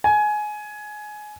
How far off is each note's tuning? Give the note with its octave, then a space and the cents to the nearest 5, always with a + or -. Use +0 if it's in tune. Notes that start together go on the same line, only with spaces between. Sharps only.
G#5 +20